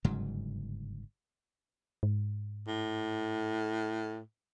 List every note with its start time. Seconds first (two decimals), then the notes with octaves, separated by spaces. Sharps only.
0.04 G1 G#2 C#3 F#3
2.03 G#2
2.67 A2